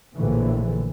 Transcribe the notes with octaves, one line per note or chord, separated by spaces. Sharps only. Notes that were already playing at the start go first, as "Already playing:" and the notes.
A#1 A2 D3 E3